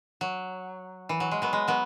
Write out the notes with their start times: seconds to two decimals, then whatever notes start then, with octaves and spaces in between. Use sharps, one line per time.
0.21 F#3
1.09 E3
1.20 F#3
1.31 G#3
1.42 F#3 B3
1.53 G#3
1.68 F#3 B3